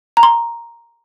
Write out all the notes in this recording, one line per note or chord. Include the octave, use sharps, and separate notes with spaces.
A#5
C6